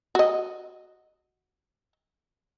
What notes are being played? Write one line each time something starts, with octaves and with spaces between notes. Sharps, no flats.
F#4 D#5